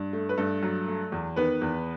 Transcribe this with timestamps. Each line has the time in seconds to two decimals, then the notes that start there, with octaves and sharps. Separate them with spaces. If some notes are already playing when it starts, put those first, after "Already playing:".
Already playing: G2
0.13 A3
0.29 B4
0.38 G2 A3 A4
0.63 F#3
0.87 A3
1.12 E2
1.36 D#3 B3 B4
1.62 E2